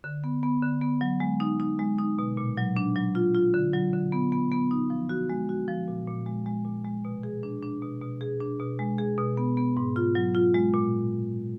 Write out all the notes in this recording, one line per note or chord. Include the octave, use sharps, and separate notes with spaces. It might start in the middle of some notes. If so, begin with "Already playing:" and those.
D3
B3
B3
D3
B3
F#3
G#3
D#4
D#4
G#3
D#4
B2
A#2
F#3
D4
F#3
F4
F4
D3
F#3
D3
B3
B3
B3
D#4
F3
F#4
G#3
F#4
F3
A#2
A#2
G#3
G#3
A#2
G#3
B2
G#4
D4
D4
B2
B2
G#4
D4
B2
G#3
G#4
B2
B3
B3
G#2
F4
F#3
F4
G#3
A#2